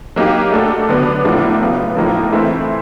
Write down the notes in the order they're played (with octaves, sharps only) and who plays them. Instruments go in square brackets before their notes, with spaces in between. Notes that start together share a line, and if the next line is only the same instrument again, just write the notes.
[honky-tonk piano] F#3 A#3 D#4 G4
A3 D4 F#4 A4
D3 F#3 B3 D4
A2 F3 A#3 D4 F#4
C#3 F#3 B3
A2 F3 A#3 D#4
E3 A3 C4 E4